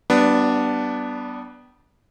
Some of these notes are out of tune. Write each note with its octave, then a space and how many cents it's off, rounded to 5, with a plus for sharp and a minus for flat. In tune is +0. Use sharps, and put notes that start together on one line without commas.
G3 -30 B3 +0 D4 +0